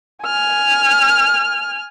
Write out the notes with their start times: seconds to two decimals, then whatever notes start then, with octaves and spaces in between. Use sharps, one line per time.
0.25 G#5 F6